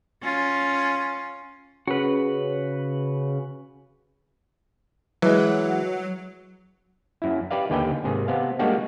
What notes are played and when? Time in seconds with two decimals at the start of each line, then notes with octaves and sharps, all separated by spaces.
0.22 C#4 F4
1.87 C#3 F#4 B4
5.22 E3 F#3 G#3
7.22 F#2 E4
7.51 G4 B4 D5 F5
7.70 D#2 D3 G4 B4 G5 G#5
8.04 G#1 C3 G#4
8.28 C3 B3 F5
8.59 G3 G#3 A#3 D4 F#4 G4